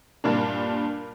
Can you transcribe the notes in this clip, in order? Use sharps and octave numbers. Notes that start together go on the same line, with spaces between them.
G2 A#2 D4